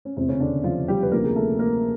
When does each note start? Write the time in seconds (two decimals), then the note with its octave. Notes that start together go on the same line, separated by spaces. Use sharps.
0.05 C#4
0.17 F1 E2 C3 C4
0.29 C#3 C#4
0.40 D3 D4
0.64 F3 F4
0.88 G3 G4
1.02 B4
1.12 D2 C3 F3 A#3 A#4
1.24 G#4
1.36 A3 A4
1.59 A#3 A#4